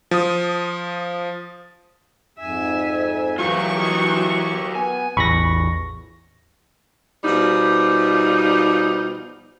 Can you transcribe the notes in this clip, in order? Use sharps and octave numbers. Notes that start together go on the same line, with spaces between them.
F3 D#6
F2 G#2 E5 G#5
E3 F#3 F4 G4 A#4 C#6
G4 A#4 D#5
B3 G#5
A1 E2 B5 C#6 A#6
B2 F3 G3 D#4